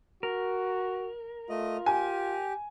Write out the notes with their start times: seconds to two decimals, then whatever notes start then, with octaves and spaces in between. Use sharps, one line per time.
0.23 F#4 A#4
1.50 A3 F4 D#5
1.86 G4 G#5